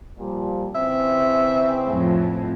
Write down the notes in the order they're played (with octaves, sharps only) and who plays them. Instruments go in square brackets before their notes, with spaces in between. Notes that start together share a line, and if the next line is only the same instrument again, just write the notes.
[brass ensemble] A#2 F3 G3
[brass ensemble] C#3 E3 C4 [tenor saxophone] E5
[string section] F2 A2